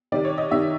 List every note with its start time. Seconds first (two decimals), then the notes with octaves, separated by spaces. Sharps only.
0.12 C3 D#3 D5
0.25 C#5
0.38 D#5
0.51 C3 D#3 E5